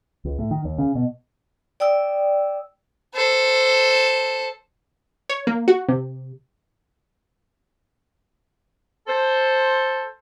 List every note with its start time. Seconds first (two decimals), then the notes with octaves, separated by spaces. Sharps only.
0.25 C#2
0.39 A2
0.51 D#3
0.65 D#2
0.78 C#3
0.95 B2
1.80 D5 G5 D#6 E6
3.14 A4 C5
5.29 C#5
5.47 A#3
5.68 F#4
5.89 C3
9.07 A4 C5